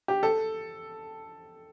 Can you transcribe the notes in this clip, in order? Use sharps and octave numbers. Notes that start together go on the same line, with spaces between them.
G4
A4